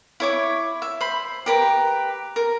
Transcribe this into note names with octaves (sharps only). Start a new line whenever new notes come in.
E4 C#5 D6
E5
C5 B5
G4 A#4 B4
A#4